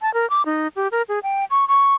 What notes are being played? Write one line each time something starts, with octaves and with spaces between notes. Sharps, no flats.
A5
A#4
D6
D#4
G4
A#4
G#4
G5
C#6
C#6